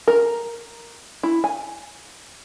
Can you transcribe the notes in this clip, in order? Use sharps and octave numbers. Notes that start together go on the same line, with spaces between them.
A#4
E4
G#5